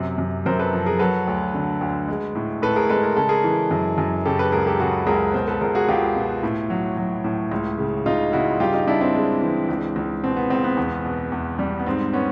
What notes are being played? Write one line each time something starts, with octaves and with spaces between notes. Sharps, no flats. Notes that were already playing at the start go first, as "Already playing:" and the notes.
Already playing: F#2 C3
F#2
F#2 A#4 C5
A4 B4
F3
G#4 A#4
F#3 A4 B4
D2
D3
D2
G#3
A2
A2 A4 B4
G#4 A#4
G#3 A4 B4
A#4
C#3 A4
G#4 A#4
E3
F#2
F#2
C#3 G4 A4
A4 B4
C#2 G#4 A#4
G4 A4
C#3 F#4 G#4
C#2 G#4 A#4
B2 A#4 C5
A4 B4
C#2 G#4 A#4
F#4 G#4
C#2 F4 G4
B2
A2
F#3
F#3
A2
C#2
C#3
C#3 D#4 F4
C#3 E4 F#4
G2 F4 G4
D#4 F4
G2 D4 E4
C4 D4
G#3
E3
C#2
C#2
B2 C4
B3
C#2 C4
B3
E2
B2
E2
G3
B3
G#2 C4
B3 C#4